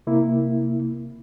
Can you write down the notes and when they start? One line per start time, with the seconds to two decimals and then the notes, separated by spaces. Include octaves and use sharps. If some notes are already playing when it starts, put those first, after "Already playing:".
0.07 C3 A#3 E4